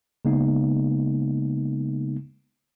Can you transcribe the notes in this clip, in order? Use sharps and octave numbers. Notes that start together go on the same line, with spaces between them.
C#3 G#3 A#3 B3 D#4